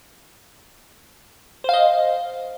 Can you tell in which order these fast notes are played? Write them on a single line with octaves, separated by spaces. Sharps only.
C5 F5 D#5